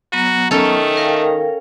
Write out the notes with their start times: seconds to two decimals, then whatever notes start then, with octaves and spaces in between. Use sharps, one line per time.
0.13 F#3 B3 F#4 A#5
0.51 D#3 A3 C#4 A4
0.97 A#4 F5 G5